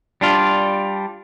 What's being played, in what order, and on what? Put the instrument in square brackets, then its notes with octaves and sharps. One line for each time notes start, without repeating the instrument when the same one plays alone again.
[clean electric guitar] G3 D4 F4